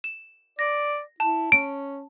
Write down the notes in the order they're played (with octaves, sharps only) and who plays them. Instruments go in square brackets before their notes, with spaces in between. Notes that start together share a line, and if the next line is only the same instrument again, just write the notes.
[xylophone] E7
[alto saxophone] D5 [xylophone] A#6
[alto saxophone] E4 [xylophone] A5
[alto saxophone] C#4 [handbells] D7